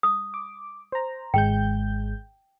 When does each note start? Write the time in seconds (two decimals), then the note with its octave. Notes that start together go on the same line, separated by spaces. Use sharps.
0.03 D#6
0.34 D6
0.92 C5 A#5
1.34 G#1 G#3 G5 G6